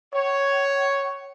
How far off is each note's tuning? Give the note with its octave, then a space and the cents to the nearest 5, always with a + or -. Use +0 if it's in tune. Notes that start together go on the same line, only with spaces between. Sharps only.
C#5 +0 F#5 +40